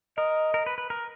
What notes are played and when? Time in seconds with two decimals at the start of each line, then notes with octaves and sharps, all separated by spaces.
0.18 A#4 D#5
0.54 A#4
0.66 B4
0.78 B4
0.90 A#4